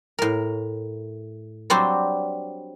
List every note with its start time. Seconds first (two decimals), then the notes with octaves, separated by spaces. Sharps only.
0.19 A2 A#4
1.70 F#3 G3 C4 D4 F#4 C5